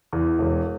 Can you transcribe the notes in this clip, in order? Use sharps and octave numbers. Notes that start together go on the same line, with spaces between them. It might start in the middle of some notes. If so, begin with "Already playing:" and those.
E2
E1